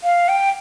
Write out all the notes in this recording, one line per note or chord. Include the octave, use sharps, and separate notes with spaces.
F5
G5